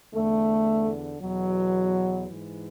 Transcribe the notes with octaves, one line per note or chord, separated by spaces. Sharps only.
E2 D3 A3
E2 B2 F#3
G#2 E3